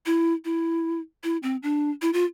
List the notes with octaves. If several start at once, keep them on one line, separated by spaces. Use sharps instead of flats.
E4
E4
E4
C4
D4
E4
F4